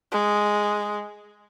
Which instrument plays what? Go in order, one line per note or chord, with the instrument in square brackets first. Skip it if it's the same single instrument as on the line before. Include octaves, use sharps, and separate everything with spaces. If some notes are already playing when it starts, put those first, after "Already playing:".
[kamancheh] G#3